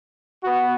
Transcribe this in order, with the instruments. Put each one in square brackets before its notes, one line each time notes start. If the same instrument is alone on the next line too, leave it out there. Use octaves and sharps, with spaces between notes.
[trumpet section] B3 F#4